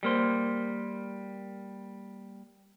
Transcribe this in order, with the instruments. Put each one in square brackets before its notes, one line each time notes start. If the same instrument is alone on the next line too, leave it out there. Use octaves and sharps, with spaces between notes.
[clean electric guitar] G3 A#3 C5